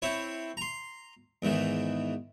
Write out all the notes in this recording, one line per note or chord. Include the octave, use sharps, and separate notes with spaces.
C4 E4 C#5
A#5 C6
E2 G#2 D#3 E3